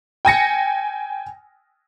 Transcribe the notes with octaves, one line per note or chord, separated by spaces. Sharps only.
G5 G#5 A#6 C#7